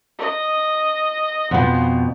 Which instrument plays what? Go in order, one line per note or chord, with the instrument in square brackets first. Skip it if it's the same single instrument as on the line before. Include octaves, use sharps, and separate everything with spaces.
[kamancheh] D#5
[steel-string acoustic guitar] F2 B2 F3 [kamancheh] B3